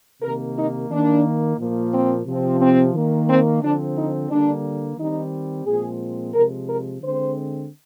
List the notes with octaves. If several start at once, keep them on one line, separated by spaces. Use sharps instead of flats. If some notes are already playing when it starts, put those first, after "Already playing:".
C3 D#3 A#3 A#4
D#4
D#3 A#3 D4
A#2 F3 A#3
C4
C3 F3 C4
C4
D#3 A#3
C4
D3 F3 C4 D4
D#4
D3 G3 A#3 D4
D#3 G3 C4 D#4
A#2 F3 G#3 C4 G#4
C3 F3 G#3 A#4
A#4
D3 G#3 C4 C5